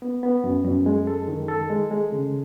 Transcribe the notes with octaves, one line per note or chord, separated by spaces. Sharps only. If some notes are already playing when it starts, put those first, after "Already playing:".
B3
B3
F#2
F#2
G#3
A4
D#3
A4
G#3
G#3
C#3